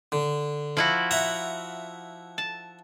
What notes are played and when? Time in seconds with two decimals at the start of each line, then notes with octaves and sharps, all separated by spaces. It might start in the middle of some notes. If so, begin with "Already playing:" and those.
0.12 D3
0.77 F3 E4 F#4
1.11 E5 F#5 A#5
2.38 A5